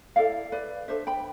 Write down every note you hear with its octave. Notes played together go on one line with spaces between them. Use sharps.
E4 A4 D5 F5
B4 D5
D4 A4 C5 E5
G5 B5